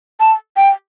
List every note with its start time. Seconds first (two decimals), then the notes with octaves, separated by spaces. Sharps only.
0.20 A5
0.57 G5